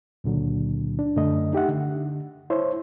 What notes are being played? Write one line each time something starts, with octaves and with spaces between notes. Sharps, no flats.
C#2 A#2 D3 F#3
D4
F#2 D3 A3 D#5
D#4 G4 E5 F#5
D3
E4 C5 C#5 E5